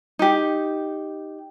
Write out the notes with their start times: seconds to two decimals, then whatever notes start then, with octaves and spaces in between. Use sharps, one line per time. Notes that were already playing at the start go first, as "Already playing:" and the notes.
0.19 D#4 G4